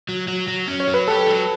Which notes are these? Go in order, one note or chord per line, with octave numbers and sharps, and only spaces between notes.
F#3
F#3
F#3
C#4
C#5
F#3
B4
G4 A4
F#3